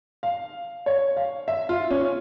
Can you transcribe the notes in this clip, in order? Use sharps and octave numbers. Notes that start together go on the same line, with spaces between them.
F5
C#5
F5
E5
F4
C#4